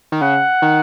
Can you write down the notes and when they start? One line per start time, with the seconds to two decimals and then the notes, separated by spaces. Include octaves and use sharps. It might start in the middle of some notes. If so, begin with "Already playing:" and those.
0.12 D#3
0.21 C#3 F#5
0.62 D#3